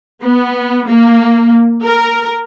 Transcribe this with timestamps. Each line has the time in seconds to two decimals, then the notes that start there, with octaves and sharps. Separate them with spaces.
0.24 B3
0.88 A#3
1.83 A#4